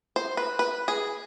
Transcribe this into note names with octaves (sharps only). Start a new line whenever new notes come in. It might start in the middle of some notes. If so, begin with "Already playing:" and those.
C5
B4
B4
G#4